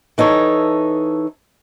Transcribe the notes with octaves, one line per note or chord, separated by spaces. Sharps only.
E3 D#4 A4 C#5